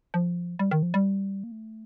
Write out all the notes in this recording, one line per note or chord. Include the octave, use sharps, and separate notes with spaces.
F3
G3
D#3
F3
G3
A#3
A3